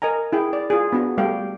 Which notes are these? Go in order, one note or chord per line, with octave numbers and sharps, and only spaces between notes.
A#4 D#5 G#5 A#5
E4 G#4 G5
D5
F4 G#4
B3 D4 F#4
G3 A3 G4 F5 G5